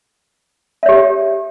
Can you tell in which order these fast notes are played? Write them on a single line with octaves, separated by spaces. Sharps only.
E5 C#5 G4